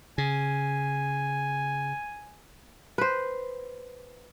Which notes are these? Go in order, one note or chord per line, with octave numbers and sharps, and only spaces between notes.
C#3 G#5
B4 C5